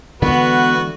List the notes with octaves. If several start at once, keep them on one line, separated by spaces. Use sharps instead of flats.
D3 E3 G#3 B3 F#4 B4